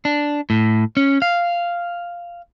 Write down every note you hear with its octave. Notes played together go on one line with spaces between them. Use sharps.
D4
A2
C#4
F5